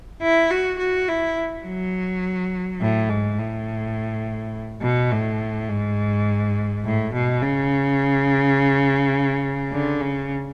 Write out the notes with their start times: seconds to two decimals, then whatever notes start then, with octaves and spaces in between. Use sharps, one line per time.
0.22 E4
0.50 F#4
0.79 F#4
1.08 E4
1.66 F#3
2.81 A2
3.09 G#2
3.39 A2
4.82 B2
5.11 A2
5.69 G#2
6.84 A2
7.13 B2
7.42 C#3
9.72 D3
10.01 C#3